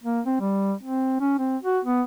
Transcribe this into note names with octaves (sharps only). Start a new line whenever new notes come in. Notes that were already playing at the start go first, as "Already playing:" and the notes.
A#3
C4
G3
C4
C#4
C4
F#4
B3